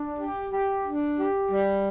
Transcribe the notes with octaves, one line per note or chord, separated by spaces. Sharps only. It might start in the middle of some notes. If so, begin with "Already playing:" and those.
Already playing: D4
G4
G4
D4
G4
G3